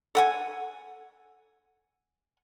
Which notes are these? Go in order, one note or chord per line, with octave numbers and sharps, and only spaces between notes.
A4 F#5 G#5